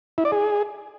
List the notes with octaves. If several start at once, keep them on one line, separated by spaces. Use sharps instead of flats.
E4
D5
G#4